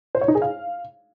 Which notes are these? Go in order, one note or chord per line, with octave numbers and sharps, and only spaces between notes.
C5
C#5
D#4
G#4
F5